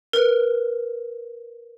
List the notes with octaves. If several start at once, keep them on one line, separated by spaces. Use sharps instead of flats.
A#4 B4